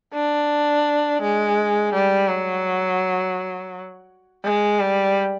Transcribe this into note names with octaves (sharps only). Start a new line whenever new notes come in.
D4
G#3
G3
F#3
G#3
G3